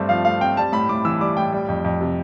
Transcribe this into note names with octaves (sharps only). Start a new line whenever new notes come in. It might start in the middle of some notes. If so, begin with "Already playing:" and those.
Already playing: G2 A3 C4
F3 F5
A3 F5
C4 G5
G3 A5
A2 B5
A2 D6
E3 E6
G3 D6
A2 G5
G3
F2
F2
C3